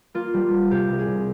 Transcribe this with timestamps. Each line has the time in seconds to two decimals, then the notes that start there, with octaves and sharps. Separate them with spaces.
0.14 A#3 F4
0.34 G3
0.52 G3
0.70 C3 G4
0.90 C2
0.99 G#4
1.07 C3